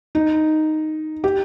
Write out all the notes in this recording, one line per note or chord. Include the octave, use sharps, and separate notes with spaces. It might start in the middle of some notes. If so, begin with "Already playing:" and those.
D#4
G4